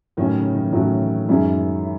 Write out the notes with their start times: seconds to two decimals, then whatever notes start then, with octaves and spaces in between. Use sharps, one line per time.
0.17 A2 D#3 F#3 C#4 E4
0.36 C#3
0.55 D#3
0.64 E3
0.72 A2 D#3 F#3 C#4 E4
1.01 E3
1.28 F#2 D#3 F#3 G#3 C#4 E4
1.83 E4